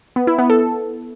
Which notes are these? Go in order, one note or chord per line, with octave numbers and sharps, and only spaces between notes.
B3
E4
B3
A4